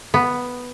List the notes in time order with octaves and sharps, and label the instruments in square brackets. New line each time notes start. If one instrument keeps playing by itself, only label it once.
[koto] B3